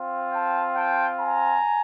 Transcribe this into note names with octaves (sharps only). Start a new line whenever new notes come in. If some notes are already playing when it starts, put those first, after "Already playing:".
Already playing: C4 F4
G5 A5
G5 A5
G#5 A#5